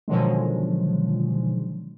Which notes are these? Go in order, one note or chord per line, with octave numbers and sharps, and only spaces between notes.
B2 D3 D#3 F3 F#3 G#3